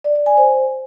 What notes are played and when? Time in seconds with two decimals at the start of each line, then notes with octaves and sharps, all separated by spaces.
0.04 D5
0.15 D5
0.26 G#5
0.37 C5